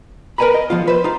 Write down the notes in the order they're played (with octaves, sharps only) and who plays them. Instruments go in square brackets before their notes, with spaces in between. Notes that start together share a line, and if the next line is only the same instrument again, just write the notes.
[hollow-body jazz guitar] A#4 B4 C#5 G#5 A#5 B5
D#5
F3 B3 F4
B4 C5
D#4 F4